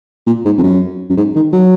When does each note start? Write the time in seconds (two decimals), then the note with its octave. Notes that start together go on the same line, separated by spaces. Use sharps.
0.27 A#2
0.45 G#2
0.58 F2
0.63 F#2
1.10 F#2
1.17 G#2
1.35 D#3
1.53 F#3